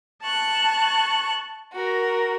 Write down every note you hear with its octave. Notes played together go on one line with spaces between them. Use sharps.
A5 C#6 F#6
F#4 A#4